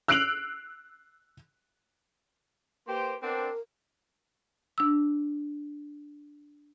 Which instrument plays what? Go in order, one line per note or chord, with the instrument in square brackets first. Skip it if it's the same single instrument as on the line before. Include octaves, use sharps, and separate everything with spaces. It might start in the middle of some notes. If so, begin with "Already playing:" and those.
[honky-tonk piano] E6 F#6 C7 D7 F7 F#7
[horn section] A#3 G4 C5 [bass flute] B4
[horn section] B3 C4 D4 [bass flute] A#4
[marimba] D4 E6